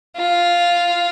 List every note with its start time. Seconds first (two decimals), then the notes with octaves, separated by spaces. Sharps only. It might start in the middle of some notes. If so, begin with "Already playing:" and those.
0.16 F4